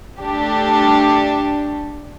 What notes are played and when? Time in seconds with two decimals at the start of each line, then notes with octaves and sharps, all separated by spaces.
0.19 A3 D4 G4